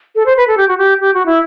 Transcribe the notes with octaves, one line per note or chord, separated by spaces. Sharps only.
A4
C5
B4
A4
G4
F#4
G4
G4
F#4
E4